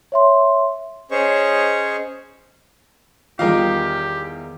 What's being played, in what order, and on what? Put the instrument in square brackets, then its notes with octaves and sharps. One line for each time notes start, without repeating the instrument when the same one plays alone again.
[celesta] C#5 E5 C6
[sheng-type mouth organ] C#4 G#4 C5 C#5 D#5 C#6
[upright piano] E2 D#3 [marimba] G3 F4 [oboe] G4 [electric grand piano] A#4 D#5 F5